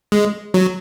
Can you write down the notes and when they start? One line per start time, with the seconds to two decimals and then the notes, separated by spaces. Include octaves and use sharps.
0.12 G#3
0.54 F#3